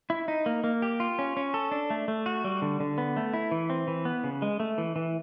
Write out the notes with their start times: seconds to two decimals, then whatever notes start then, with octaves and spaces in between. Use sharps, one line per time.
0.10 E4
0.28 D#4
0.46 A#3
0.64 A#3
0.82 G4
1.00 F4
1.19 C#4
1.37 C#4
1.54 A4
1.72 D4
1.90 A3
2.08 A3
2.26 F#4
2.44 G3
2.62 D3
2.80 D3
2.98 B3
3.17 A3
3.34 E4
3.51 E3
3.70 C4
3.88 E3
4.05 B3
4.24 C#3
4.42 G#3
4.60 A3
4.78 E3
4.96 E3